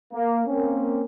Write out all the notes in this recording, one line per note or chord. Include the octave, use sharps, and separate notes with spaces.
A#3
A#3 C4 C#4